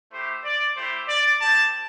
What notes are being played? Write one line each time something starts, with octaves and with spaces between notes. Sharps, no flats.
A3 E4 G4 C5
D5
A3 E4 G4 C5
D5
C4 G4 A5